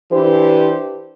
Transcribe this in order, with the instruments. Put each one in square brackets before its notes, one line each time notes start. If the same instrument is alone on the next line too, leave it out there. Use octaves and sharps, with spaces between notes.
[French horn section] E3 D4 G4 C5